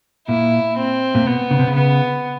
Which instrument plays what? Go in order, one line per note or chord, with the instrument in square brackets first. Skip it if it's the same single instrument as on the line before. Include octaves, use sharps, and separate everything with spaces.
[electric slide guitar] A#2 [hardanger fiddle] E4
[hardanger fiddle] C4
[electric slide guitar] A#2
[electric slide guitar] B2 [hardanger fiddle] B3
[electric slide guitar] C#3
C3
C#3
[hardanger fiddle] B3